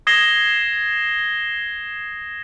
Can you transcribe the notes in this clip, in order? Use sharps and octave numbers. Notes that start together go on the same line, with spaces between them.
D#6 G#6 A#6 C7 E7 G7